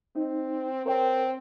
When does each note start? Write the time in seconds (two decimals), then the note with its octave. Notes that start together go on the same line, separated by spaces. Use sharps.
0.15 C4 D#4
0.86 C4 A#4 C#5 G5